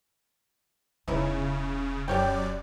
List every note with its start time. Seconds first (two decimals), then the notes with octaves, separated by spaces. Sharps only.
1.08 E1 C#3 D#4 E4 C#5
2.08 F#2 G4 C#5 D5 G5